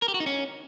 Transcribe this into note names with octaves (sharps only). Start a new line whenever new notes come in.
A#4
G4
F#4
D#4
C#4